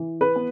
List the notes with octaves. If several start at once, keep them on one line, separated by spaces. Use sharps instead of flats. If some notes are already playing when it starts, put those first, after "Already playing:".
Already playing: E3
B4
B3